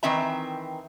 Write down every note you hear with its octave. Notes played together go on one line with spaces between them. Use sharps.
D#3 E3 C4 E5 A#5